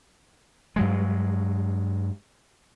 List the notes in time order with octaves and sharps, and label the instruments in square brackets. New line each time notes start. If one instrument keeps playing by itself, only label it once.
[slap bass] G2 F#3 G#3